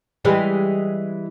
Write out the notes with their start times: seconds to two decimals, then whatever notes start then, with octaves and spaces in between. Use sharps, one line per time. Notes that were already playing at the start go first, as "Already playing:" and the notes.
0.25 E3 G3 G#3